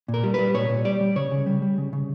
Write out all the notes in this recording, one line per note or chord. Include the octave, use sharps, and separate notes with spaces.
A#2
A#4
G3
G3 B4
A#2 C#5
A#2
G3 D5
G3
C#3 C#5
C#3
G3
G3
C#3
C#3